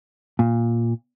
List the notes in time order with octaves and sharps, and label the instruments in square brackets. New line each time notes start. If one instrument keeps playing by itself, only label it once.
[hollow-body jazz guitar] A#2